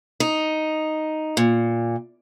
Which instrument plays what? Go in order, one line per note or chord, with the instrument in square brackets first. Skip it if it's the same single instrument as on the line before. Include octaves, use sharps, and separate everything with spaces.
[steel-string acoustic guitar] D#4
A#2